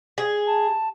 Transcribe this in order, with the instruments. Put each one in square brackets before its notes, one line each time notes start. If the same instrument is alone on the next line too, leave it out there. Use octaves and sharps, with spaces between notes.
[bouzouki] G#4
[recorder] A5